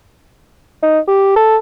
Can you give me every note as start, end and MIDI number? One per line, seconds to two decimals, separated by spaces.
0.82 1.00 63
1.08 1.31 67
1.36 1.57 69